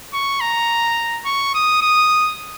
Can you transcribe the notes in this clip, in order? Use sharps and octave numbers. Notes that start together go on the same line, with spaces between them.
C#6
A#5
C#6
D#6
D#6